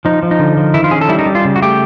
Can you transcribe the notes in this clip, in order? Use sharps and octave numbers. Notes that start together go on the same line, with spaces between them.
F3 D#4
F3
D#4
D3
F3
D#3 E4
F4
C#4 G#4
A4
G3 E4
D#4
G3
F4
C#3
F#4
A3 G4